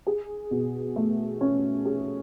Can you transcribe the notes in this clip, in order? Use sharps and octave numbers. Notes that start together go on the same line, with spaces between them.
G#4
B2
A3
C#4
G#4